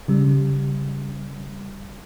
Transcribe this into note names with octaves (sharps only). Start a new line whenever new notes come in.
C#3 G3